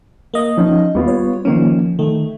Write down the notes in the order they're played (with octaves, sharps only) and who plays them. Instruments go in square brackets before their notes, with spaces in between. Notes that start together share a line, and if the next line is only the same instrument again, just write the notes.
[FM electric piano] A#3 D#5
[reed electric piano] F3 C#4 D#4
[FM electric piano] D#2 [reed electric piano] G3 B3 F4
[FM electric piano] C#5
[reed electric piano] D#3 A#3 C#4 [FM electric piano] F3
[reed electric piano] D#3 [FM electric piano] A3